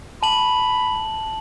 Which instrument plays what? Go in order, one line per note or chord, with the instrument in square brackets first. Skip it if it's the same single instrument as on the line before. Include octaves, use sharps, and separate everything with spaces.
[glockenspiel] A5 F#7 [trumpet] B5